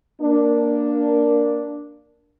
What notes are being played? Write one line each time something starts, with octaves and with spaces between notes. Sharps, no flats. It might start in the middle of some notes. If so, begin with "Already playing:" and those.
A#3 D4